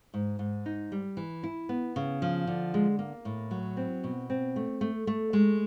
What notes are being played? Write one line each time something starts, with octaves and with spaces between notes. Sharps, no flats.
G#2
G#2
D#4
G3
E3
E4
B3
C#3
F3
D3
G#3
A#3
A2
F#3
C4
B2
C4
A3
A3
A3
G#3